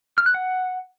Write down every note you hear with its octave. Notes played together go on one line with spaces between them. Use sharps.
F6
F#6
F#5